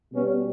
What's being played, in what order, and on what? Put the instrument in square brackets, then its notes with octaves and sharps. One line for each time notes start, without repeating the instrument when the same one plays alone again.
[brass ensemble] B2 G3 B3 C#4